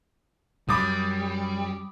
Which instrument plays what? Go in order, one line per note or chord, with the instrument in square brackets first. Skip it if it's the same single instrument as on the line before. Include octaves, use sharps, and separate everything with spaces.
[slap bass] F#2 [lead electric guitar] G3 [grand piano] B5 D6 D#6